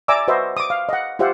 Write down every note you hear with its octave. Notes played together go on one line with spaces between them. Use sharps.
D5 E5 G#5 A#5 D6 E6
F#4 B4 C5 D#5 E5
D6 D#6
F5
D#5 F#5
F4 G4 C5 E5 F#5